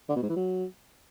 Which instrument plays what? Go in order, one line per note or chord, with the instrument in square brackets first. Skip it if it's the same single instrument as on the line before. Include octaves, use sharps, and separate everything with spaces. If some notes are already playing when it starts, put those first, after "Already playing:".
[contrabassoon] D3
B2
G#2
E3
F#3